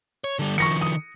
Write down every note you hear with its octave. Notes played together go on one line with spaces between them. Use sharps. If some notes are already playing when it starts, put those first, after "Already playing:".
C#5
D3 G3
D#3 F3 C#6 A#6 C#7
D#6